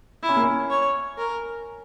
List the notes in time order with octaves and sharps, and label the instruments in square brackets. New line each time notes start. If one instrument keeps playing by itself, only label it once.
[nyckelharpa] E4
[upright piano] C#4
A#3
C#4
[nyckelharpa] C#5
A#4